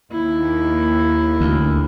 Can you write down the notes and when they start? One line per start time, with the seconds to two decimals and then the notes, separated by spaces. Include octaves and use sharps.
0.12 D#2 E4
1.41 D2